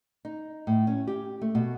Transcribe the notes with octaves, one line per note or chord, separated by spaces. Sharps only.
D#4
A2
C#4
G4
A3
B2